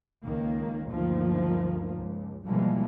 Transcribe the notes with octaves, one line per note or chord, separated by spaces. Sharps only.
C#2 D#3 A#3
D2 G2 D#3 F3 A#3
C#2
B2 E3 F3 G3 G#3 A#3